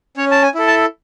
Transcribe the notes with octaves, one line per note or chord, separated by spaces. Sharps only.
C#4 C#5
A5
G#5
E4 A4
A5